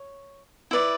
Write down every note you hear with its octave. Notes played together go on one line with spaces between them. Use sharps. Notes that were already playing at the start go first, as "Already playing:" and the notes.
Already playing: C#5
E4 B4 D5